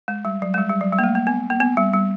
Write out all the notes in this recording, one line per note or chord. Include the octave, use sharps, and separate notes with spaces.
G#3
G3
F#3
G#3
G3
G3
F#3
G3
A#3
A3
A#3
B3
A#3
B3
G3
G3